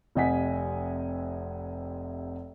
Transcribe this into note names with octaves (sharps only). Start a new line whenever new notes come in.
F1 C3 D#5 F#5 G#5 B6